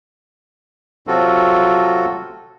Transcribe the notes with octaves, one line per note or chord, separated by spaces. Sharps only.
C3 F#3 C4 F4 F#4 A4